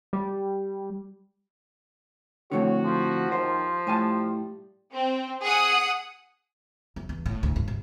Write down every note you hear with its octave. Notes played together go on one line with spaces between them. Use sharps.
G3
F2 A2 D3 F#4 C#5
F3
D#2 C5
A2 G3 G#5 A5
C4
G#4 F#5 D#6
F#2
E2
A2
D2
G2
A#1